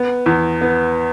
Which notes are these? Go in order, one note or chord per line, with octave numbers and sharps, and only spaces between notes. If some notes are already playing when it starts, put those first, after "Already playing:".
Already playing: B3
E2
B3